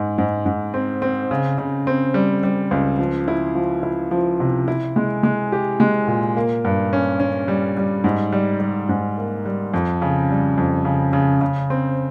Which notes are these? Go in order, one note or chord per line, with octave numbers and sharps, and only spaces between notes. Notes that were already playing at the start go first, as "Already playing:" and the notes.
Already playing: G#2 G#3
G#2
G#2
C4
C4
C#3
C#3
C4
G3
G3
C#2
F3
E4
F3
E4
F3
C3
E4
G#3
G#3
G4
G#3
A#2
A#3
G2
C#4
C#4
G3
G3
G#2
G3
G3
G#2
A#3
G3
F2
C#3
G3
F2
C#3
C#3
C#3
C4